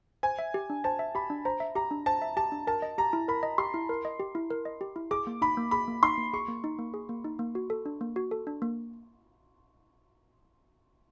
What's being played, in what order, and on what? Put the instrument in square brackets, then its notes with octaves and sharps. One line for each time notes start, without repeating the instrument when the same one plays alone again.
[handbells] C5 [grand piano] G#5
[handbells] E5
G4
D4
[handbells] C5 [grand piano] A5
[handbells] E5
[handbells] G4 [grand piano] B5
[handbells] D4
[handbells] C5 [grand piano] A#5
[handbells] E5
[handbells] G4 [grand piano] A#5
[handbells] D4
[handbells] C5 [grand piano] A5
[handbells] E5
[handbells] G4 [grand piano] A5
[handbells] D4
[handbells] A#4 [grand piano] A5
[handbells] D#5
[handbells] G4 [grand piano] A#5
[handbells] E4
[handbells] A#4 [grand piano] B5
[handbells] D#5
[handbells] G4 [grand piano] C6
[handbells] E4
A#4
D#5
G4
E4
A#4
D#5
G4
E4
[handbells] G#4 [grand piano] D6
[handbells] A#3
[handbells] D#4 [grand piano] B5
[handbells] A#3
[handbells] G#4 [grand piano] B5
[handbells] A#3
[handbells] D#4 [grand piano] C6
[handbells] A#3
[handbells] G#4 [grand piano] C#6
[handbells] A#3
D#4
A#3
G#4
A#3
D#4
A#3
F#4
A4
D4
A#3
F#4
A4
D4
A#3